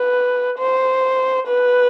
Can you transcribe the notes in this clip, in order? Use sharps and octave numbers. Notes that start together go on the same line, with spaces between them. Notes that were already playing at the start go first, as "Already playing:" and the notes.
Already playing: B4
C5
B4